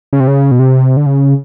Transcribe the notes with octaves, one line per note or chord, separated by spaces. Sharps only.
C#3
C3
C#3
B2
C3
D3
C#3